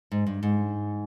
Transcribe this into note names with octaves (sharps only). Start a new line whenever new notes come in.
G#2
G2
G#2